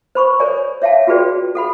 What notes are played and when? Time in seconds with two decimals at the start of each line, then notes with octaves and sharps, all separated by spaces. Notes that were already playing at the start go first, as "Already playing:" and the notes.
0.15 C5 B5 C#6
0.39 A4 A#4 C#5 D5 G#5
0.82 C#5 E5 F5 G5 A5
1.07 F4 F#4 G#4 B4 D5 G5
1.55 A4 F#5 B5